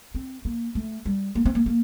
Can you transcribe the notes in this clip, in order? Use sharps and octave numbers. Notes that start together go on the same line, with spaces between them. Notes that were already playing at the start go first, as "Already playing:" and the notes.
C4
A#3
A3
G3
A#3
C4
A#3
A#3